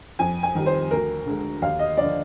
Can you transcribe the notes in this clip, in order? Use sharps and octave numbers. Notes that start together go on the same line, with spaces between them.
F2 G#5
G#5
D#3 G3
C5
D2 A#4
D3 G#3
D#2 F5
D#5
D3 F3 D5